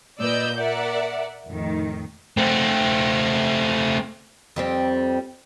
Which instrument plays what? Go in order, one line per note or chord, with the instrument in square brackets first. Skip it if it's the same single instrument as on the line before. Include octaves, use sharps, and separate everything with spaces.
[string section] A#2 B4 D5 D#5 E6 G6
A#4 D5 E5 F#5
F2 A2 D#3
[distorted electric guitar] A3 C4
[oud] F2 G3 C4